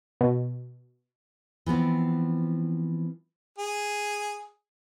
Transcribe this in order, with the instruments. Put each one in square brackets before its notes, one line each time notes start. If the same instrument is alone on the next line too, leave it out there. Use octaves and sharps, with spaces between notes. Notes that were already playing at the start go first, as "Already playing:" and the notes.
[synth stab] B2
[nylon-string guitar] E3 F3 B3 C4
[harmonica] G#4